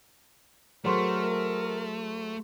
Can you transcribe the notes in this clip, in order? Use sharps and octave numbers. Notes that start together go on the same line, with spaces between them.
F#3 A3 G#4 A#4 C5 C6 C#6